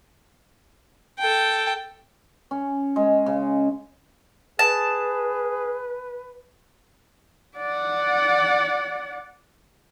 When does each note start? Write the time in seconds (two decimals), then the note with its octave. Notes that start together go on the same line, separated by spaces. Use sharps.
1.19 A4 G5
2.51 C#4
2.96 G#3
3.26 C#3
4.59 G#4 B4 A5
7.57 D5 F#5